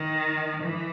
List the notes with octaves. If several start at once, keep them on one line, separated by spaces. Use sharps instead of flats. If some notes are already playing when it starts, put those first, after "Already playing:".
Already playing: D#3
E3